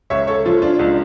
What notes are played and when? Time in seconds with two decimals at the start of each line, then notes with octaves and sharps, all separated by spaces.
0.10 C#2 C#5 E5
0.27 A4 C#5
0.45 F3 F4 A4
0.62 D4 F4
0.79 C#2 D4 F4